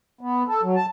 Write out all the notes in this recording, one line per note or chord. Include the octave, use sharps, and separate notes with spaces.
B3
A4
F#3
A5